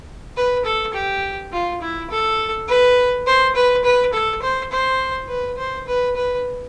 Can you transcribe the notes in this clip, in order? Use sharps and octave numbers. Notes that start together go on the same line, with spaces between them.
B4
A4
G4
F4
E4
A4
B4
C5
B4
B4
A4
C5
C5
B4
C5
B4
B4